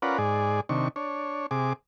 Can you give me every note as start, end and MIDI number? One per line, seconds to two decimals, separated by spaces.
0.02 0.18 61
0.02 0.18 65
0.02 0.18 70
0.02 0.18 71
0.02 0.18 74
0.02 0.18 78
0.18 0.61 44
0.18 0.61 68
0.18 0.61 74
0.69 0.88 48
0.69 0.88 51
0.69 0.88 62
0.69 0.88 85
0.96 1.46 62
0.96 1.46 73
1.51 1.73 48
1.51 1.73 68
1.51 1.73 86